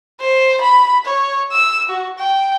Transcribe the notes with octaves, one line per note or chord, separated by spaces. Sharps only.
C5
B5
C#5
E6
F#4
G5